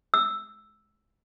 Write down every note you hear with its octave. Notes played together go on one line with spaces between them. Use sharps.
E6